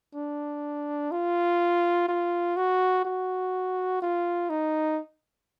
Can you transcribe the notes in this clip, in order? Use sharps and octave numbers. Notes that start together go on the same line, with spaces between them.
D4
F4
F4
F#4
F#4
F4
D#4